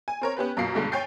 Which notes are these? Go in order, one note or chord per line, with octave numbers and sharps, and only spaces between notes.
G#5
C4 A#4 C#5
B3 C#4 G4 B4
F#2 B2 A#3 F4 C7
B1 G2 D3 G#3 A3
C#5 G5 G#5 G6 A6 C7